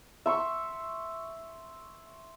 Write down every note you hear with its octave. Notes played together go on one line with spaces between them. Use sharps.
E5 C6 C#6